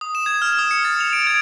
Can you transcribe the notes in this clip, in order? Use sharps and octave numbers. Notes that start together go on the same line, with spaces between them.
D#6
E7
G#6
F6
D#6
C#7
A6
F7
D7
G#6